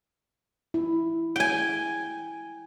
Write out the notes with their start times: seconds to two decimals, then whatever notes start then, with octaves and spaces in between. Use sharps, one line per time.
0.74 E4
1.36 G5 G#5